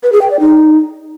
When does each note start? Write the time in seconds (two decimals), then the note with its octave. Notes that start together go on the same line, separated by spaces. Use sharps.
0.03 B4
0.12 G#4
0.22 G5
0.31 D5
0.40 D#4